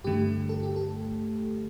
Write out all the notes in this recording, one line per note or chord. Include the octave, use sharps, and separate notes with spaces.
G2 D3 A3 G4
A4
G4
A4